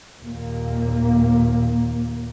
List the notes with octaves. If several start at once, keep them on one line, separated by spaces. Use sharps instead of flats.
D#2 A#2 A#3